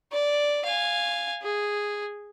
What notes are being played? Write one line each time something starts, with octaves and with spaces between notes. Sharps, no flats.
D5
F5 G#5
G#4